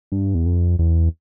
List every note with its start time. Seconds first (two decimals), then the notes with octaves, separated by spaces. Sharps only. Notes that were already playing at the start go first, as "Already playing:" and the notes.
0.12 G2
0.35 E2
0.46 F2
0.79 E2